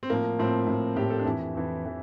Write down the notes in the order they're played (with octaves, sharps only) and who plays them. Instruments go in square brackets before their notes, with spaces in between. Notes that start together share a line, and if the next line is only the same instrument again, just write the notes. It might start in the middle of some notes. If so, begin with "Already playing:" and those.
[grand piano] C4
A2 F3 A#3
A2 F3 C4
A2 F3
A2 F3 G4
A4
D4
F2 E3 E4
F2 E3
E3